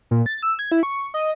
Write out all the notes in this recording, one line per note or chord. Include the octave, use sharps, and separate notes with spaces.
A#2
A6
E6
G#6
E4
C#6
D#5